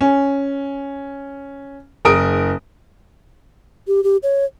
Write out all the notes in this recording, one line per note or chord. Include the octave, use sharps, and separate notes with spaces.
C#4
F#1 A#4 D#6 D7
G4
G4
C#5